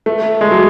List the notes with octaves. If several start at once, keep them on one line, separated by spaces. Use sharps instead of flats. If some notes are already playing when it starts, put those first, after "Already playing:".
A3
G#3
F#3